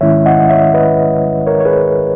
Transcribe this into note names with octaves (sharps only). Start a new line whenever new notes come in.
G#2 D#3 G#3 C#4 E4 C#5 E5
D#5 F#5
C#5 E5
B4 D#5
A#4 C#5
C#5
G#4 B4